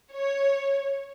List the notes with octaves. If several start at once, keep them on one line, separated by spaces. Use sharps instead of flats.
C#5